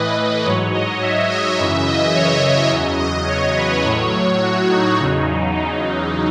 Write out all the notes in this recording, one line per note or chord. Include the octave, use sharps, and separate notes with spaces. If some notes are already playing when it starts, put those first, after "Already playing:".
Already playing: A2 E3 B4 D#5
D#5
G#2 F#3 C#5
D#5
E5
D#5
F#2 C#3 E3 E5
D#5
C#5
E5
E2 C#3 F#3 D#5
D#5
C#5
B4
A2 F#3 C#5
F#4
D#4
E2 C#3 F#3
D#4